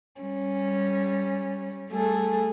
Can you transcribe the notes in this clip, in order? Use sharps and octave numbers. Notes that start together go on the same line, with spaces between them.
G3 C#4
G3 A3 G#4 A4